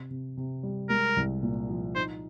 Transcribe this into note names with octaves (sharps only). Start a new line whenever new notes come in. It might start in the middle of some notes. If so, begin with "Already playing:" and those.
Already playing: C3
C3
C3
G3
G#3 A#4
C2
A#2
F3
D#4 C5